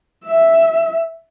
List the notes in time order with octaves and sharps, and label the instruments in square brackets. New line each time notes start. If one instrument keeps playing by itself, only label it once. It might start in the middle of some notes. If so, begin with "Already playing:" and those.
[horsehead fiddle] E5